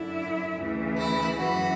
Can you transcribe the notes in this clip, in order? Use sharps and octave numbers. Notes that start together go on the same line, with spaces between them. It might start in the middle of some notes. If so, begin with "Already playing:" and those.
Already playing: F#2 D3 E4
D2 C#3 E3
E4
F#2 E3 F#4